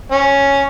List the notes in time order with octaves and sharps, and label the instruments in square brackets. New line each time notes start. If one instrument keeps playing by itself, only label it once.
[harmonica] C#4